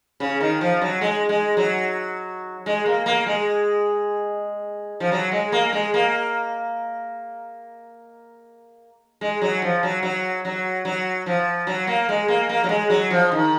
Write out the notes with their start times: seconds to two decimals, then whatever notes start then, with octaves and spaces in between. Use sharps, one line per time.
0.20 C#3
0.40 D#3
0.61 F3
0.81 F#3
1.01 G#3
1.29 G#3
1.57 F#3
2.66 G#3
2.86 A#3
3.06 A#3
3.26 G#3
5.00 F3
5.12 F#3
5.32 G#3
5.52 A#3
5.73 G#3
5.94 A#3
9.21 G#3
9.42 F#3
9.62 F3
9.83 F#3
10.03 F#3
10.45 F#3
10.85 F#3
11.26 F3
11.67 F#3
11.87 A#3
12.09 G#3
12.28 A#3
12.49 A#3
12.64 F#3
12.69 G#3
12.90 F#3
13.11 F3
13.32 D#3